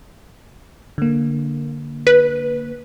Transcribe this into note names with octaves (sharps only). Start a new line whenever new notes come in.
D3 A#3
B4